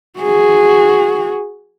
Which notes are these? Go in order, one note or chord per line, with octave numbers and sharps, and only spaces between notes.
F#4 G#4